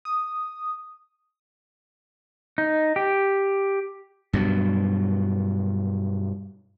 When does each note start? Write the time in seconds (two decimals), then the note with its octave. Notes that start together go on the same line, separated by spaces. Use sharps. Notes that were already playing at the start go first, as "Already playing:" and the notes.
0.05 D#6
2.58 D#4
2.96 G4
4.33 G2 B2 F#3